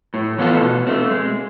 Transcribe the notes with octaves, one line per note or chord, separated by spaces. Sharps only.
A2
E3 B3 F4 A4
B2
A3 C4
G#3